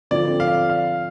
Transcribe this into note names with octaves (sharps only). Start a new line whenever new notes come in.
D3 F3 C4 F4 D5
F5
F5